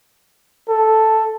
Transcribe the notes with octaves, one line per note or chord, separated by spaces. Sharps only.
A4